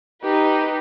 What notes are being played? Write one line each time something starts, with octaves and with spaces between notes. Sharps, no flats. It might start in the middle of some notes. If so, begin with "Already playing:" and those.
D#4 G4 B4